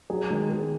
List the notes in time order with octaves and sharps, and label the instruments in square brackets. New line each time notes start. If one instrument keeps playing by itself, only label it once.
[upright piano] F#3 [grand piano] G#4
[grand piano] D#3 [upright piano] G#3
[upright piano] B3 [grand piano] G#4